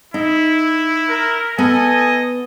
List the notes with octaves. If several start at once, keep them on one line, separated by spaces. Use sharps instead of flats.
D#4 E4
A#4
B3 A4 D#5 G#5